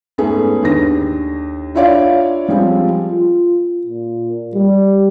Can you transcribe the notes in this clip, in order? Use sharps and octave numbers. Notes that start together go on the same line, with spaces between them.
G#2 A3 B3 C#4 G#4
D#2 D3 A#6
D4 E4 F4 C#5 D5 F5
F3 G3 G#3 C4
F4
A#2
G3